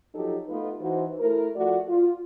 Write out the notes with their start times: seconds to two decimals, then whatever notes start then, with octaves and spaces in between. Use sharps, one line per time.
0.14 F3 F#3 D#4 G4 A4
0.48 A3 B3 D#4 F4 B4
0.80 E3 D#4 F#4 C5
1.20 A3 E4 A#4
1.56 F3 A3 F#4 D5
1.87 F4